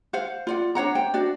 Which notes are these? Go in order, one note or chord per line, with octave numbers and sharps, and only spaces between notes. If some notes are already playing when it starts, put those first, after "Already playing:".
C5 F5 F#5
F4 D5 F#5
D4 C#5 F#5 A#5
C5 G5
D4 F#4 D5